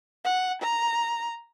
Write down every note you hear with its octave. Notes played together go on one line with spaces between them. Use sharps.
F#5
A#5